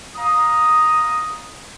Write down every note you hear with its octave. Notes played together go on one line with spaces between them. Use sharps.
F5 A#5 D#6